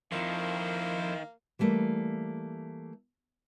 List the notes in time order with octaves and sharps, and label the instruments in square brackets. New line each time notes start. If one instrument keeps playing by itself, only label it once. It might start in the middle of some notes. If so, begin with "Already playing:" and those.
[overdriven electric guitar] F2 F3 [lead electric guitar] D#3 [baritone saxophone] A#3 [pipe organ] E4 C5
[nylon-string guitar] E3 G3 A3 A#3